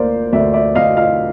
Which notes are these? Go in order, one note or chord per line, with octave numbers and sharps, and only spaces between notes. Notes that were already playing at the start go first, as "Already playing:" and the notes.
Already playing: D2 A#3 C5 D5
D2 D5 E5
D5 E5
D2 D#5 F5
D#5 F5